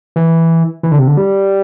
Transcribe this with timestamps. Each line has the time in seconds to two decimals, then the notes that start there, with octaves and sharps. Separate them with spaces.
0.16 E3
0.83 E3
0.91 D3
0.98 C3
1.07 D3
1.17 G3